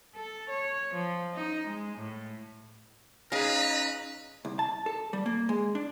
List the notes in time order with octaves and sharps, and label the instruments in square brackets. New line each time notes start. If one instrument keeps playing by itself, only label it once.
[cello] A4
C#5
F3
D#4
G#3
A2
[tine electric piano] C#4 D#4 [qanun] G#4 F5 [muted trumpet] B4 [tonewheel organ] D#5 A#5
[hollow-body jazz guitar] C2
A5
A4
G3
A#3
G#3
D4